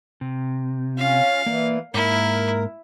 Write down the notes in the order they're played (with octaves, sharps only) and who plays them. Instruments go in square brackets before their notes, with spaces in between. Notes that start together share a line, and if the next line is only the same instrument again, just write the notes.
[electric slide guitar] C3
[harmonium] C#4 F4 [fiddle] F5
[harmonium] E3 [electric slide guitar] A#3 D5
[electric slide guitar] G#2 A#3 [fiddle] E4 [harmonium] A#4